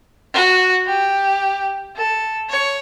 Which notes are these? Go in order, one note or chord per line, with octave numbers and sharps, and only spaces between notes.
F#4
G4
A4
C#5